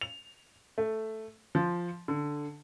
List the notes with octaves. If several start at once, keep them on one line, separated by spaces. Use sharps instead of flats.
F7
A3
F3
D3